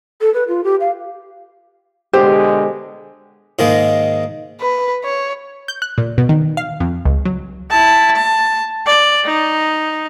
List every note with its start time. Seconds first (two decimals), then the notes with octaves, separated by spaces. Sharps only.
0.21 A4
0.34 B4
0.48 F4
0.64 G4
0.80 F5
2.13 B2 D3 G#3 G4 C5
3.59 G#2 D#3 G#3 A#3
4.61 B4
5.04 C#5
5.68 G6
5.82 F#6
5.98 A#2
6.18 B2
6.29 D#3
6.57 F5
6.80 F2
7.05 C#2
7.25 F#3
7.71 E4 A5
8.16 A5
8.86 D5
9.25 D#4